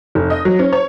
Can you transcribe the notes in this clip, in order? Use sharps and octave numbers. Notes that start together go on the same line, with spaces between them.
F1
D#5
F#3
C#4
C#5